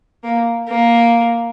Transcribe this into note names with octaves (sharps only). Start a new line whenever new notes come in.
A#3
A#3